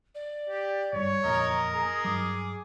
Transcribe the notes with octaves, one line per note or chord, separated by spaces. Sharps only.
D5
G4
G#1 G2 C#5
F#1 F2 A#2 A#4 D#5 A#5
G#4
G2 F#3 D6